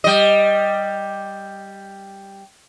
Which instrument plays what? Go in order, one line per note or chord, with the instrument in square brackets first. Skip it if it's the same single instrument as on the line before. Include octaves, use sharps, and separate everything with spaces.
[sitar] G3 D#5